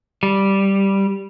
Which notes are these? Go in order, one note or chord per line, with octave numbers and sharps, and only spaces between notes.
G3